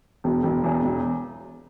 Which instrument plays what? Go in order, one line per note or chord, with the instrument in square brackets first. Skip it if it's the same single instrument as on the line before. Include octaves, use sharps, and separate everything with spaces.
[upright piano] E1
E1
E2
E1